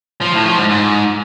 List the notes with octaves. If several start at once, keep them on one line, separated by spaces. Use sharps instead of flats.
F3
A2
F3
G#2
G#2